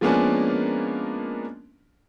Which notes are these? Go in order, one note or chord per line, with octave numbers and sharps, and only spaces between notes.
F3 G#3 A#3 B3 C#4 D4